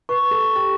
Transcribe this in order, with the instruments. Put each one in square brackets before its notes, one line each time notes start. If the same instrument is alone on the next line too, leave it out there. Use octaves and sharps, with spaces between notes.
[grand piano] B4 [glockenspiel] C#6
[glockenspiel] C#6
[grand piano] A4
[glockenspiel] C#6
[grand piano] G4 [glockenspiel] A6